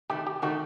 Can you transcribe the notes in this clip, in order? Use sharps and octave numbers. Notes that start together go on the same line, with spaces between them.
C3 D#3 A3 G4
G4
C3 D#3 A3 F#4